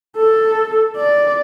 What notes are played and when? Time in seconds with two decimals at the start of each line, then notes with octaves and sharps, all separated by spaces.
0.16 A4
0.96 D5